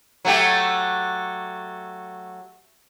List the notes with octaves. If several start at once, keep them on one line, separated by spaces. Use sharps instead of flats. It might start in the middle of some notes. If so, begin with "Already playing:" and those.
F#3 A3 G4